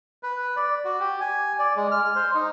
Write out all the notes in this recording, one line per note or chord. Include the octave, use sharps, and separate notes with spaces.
B4
D5
F#4
G4
G#5
D5
G#3
F6
C5
D#4